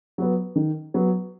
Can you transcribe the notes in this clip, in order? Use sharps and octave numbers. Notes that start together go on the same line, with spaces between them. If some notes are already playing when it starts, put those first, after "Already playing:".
F#3 B3
D#3
F#3 B3